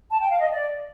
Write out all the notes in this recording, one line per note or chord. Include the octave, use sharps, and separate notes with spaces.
A5
G5
F5
D#5
D5